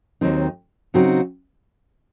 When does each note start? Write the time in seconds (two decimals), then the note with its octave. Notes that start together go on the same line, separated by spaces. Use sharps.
0.21 D#2 D#3 F#3 C4 D#4
0.94 C#3 F#3 C4 D#4 F#4